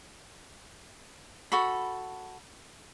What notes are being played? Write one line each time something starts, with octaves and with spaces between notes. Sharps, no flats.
F#4 A4 B5